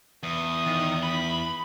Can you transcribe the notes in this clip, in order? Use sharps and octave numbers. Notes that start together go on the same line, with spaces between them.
E2 D#6
D#3
B5